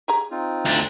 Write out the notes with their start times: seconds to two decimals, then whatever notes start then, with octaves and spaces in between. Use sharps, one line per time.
0.08 G4 G#4 A#5
0.31 C4 D#4 F4
0.66 D2 D4